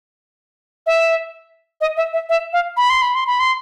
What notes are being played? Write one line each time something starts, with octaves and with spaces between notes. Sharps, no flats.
E5
D#5
E5
E5
E5
F5
B5
C6
B5
C6
B5
C6